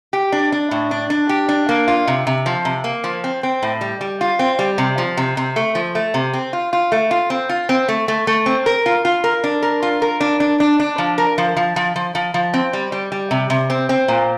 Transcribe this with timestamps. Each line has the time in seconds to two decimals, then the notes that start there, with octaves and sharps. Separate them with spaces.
0.13 G4
0.32 D4
0.52 D4
0.71 A2
0.91 D4
1.10 D4
1.29 G4
1.49 D4
1.69 A#3
1.88 F4
2.07 C3
2.27 C3
2.46 F3
2.65 C3
2.84 A#3
3.04 F3
3.24 C4
3.43 C4
3.62 A2
3.81 G3
4.01 G3
4.21 F4
4.39 C4
4.59 G3
4.78 C3
4.98 F3
5.17 C3
5.37 C3
5.56 A3
5.75 F3
5.95 A3
6.14 C3
6.33 C4
6.53 F4
6.73 F4
6.92 A3
7.11 F4
7.30 C4
7.49 F4
7.69 C4
7.88 A3
8.08 A3
8.27 A3
8.46 C4
8.66 A#4
8.86 F4
9.05 F4
9.24 A#4
9.44 D4
9.63 A#4
9.82 F4
10.02 A#4
10.20 D4
10.40 D4
10.60 D4
10.80 D4
10.98 F3
11.18 A#4
11.38 F3
11.56 F3
11.76 F3
11.96 F3
12.15 F3
12.34 F3
12.54 C4
12.73 G3
12.92 G3
13.12 G3
13.31 C3
13.50 C3
13.70 C4
13.89 C4
14.08 A#2